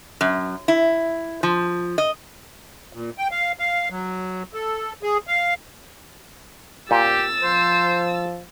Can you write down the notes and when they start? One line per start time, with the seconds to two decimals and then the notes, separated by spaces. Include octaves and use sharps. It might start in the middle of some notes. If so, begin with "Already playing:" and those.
0.21 F#2
0.68 E4
1.43 F3
1.98 D#5
2.93 A#2
3.18 G5
3.31 F5
3.59 F5
3.90 F#3
4.54 A4
5.03 G#4
5.27 F5
6.91 A#2 G4 E6 A6
7.43 F3 C5